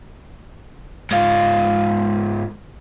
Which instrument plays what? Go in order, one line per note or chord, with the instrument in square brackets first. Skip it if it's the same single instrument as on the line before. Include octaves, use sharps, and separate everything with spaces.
[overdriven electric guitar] G#2 F4